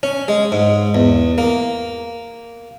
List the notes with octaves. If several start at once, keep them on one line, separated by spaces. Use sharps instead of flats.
C#4
G#3
G#2
E2
A#3